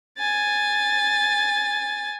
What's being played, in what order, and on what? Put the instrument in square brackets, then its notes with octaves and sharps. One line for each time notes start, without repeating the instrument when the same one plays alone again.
[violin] G#5 A6